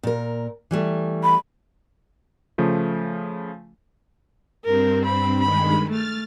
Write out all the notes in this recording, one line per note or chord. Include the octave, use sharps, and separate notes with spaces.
A#2 A#4
E3 G3 A3
B5
C#3 F3 A3
G2 C4 A#4
B5
G2 D#3 G#3 B5
A3 F6 A6